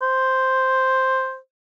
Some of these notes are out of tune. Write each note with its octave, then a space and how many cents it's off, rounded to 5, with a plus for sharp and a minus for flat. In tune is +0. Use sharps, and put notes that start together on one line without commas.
C5 +0